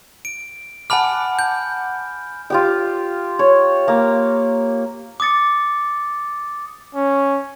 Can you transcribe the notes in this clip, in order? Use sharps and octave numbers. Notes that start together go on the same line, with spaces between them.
D7
F#5 G#5 A5 B5 D6 F6
G6
F4 G4 G5
C#5
A#3
D6 D#6 A6 C#7
C#4